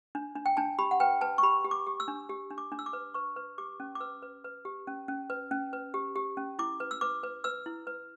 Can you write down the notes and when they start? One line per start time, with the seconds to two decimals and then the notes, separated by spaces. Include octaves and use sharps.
0.15 D4
0.36 D4
0.46 G5
0.57 D4 A5
0.79 G4 B5
0.91 F#5
1.00 B4 G5
1.21 B4 A5
1.38 C#6
1.43 G4 B5
1.65 G4
1.71 D6
1.87 G4
2.00 E6
2.08 D4
2.30 G4
2.51 D4
2.58 D6
2.72 D4
2.79 E6
2.86 D6
2.93 B4
3.14 B4 C#6
3.36 B4
3.58 G4 D6
3.80 C#4
3.95 D6
4.00 B4 E6
4.22 B4
4.44 B4
4.65 G4
4.87 C#4
5.08 C#4
5.30 B4
5.51 C#4
5.73 B4
5.94 G4
6.16 G4
6.37 C#4
6.59 E4 D6
6.80 B4
6.91 E6
7.01 B4 D6
7.23 B4
7.44 B4 E6
7.66 E4
7.87 B4